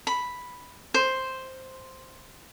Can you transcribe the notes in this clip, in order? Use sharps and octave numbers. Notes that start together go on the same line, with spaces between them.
B5
C5